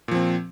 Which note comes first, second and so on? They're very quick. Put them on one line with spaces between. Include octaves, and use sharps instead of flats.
A#2 F3 C4